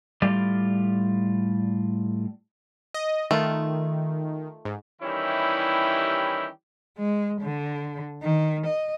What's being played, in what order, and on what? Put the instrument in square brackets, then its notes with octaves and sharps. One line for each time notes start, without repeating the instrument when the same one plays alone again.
[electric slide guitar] A2 G3 F4 G4 D5
[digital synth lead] D#5
[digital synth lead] D#3 [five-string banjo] A3 F4
[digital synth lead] G#2
[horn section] D#3 E3 G3 C#4 E4 G4
[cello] G#3
D3
D#3
D#5